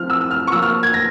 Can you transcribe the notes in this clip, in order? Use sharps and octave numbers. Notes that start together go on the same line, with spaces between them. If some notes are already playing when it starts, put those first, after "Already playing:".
Already playing: F3 C4 E4 F6
E6
E6
F6
C#6
F3 A#3 F4 E6
F6
G#6
A#6